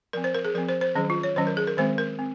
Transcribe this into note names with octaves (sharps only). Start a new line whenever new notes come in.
F3 C4 A#4
C5
A#4
G#4
F3 C4 A#4
C5
C5
D#3 F#3 C#4 G#4
F4
C#5
D#3 F#3 C#4 C5
A#4
G#4
A#4
D#3 G#3 C4 C5
A#4
C4